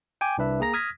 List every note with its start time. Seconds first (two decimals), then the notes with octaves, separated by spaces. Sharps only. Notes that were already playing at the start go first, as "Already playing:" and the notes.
0.21 G5 G#5 D6
0.38 C2 D4 B4 E5
0.60 A#3 G#4 A#5 A#6
0.74 D#6 F6 G#6 A#6 B6